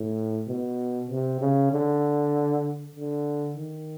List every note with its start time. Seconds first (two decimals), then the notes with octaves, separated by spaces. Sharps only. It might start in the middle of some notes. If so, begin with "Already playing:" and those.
Already playing: A2
0.48 B2
1.10 C3
1.41 C#3
1.72 D3
2.96 D3
3.57 D#3